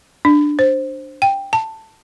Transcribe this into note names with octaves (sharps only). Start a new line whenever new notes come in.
D4
C5
G5
A5